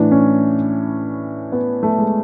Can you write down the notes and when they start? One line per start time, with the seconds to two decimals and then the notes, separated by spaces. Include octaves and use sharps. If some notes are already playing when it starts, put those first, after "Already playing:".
Already playing: A2 E3 D4
0.11 C#4
1.52 B3
1.83 A3
1.98 G#3